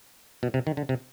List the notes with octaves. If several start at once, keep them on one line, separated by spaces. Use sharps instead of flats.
B2
C3
D#3
D3
C3